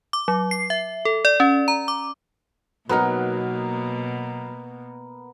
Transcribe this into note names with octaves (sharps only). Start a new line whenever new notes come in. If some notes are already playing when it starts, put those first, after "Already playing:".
D6
F#3
C7
E5
A4
D5
C#4
A#5
D6
B2 F#3 A#3 B3 D#4 A#4